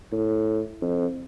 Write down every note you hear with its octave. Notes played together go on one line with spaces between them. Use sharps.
A2
F2